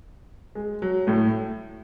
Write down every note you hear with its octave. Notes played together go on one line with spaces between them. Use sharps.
G#3
F#3
A2 A3